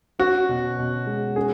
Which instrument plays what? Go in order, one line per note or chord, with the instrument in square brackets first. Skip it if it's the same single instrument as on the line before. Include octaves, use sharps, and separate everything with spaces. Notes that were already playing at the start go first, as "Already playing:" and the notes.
[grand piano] C#4 [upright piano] F#4
[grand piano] B2
B2
G#3
[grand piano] C#4 [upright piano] G#4